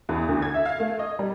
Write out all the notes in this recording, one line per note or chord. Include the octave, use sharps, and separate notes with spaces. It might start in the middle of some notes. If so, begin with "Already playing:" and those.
E2
D2
G#6
E5
F5
A3
D#5
G3